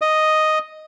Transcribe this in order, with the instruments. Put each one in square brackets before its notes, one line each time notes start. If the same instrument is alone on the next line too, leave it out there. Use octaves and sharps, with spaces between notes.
[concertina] D#5